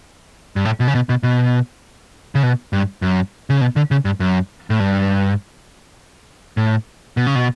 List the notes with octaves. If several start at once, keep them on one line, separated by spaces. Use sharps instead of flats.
G2
A2
B2
C#3
B2
B2
B2
C#3
B2
G2
F#2
C#3
B2
D3
C#3
G2
F#2
A2
G2
A2
B2
C#3
B2